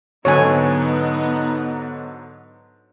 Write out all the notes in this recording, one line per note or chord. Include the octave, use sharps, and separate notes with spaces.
G#2 D3 F#3 B3 D#4 C#5 G#5